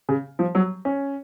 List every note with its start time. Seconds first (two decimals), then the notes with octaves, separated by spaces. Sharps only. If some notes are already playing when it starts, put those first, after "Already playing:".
0.09 C#3
0.39 F3
0.55 F#3
0.85 C#4